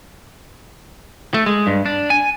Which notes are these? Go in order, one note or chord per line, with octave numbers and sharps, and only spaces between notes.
A3
G#3
G2
D4
G#5